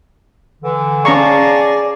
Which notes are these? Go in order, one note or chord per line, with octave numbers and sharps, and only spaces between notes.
D3 E3
C#4 G#4 D5 F5 A5 A#5 C#6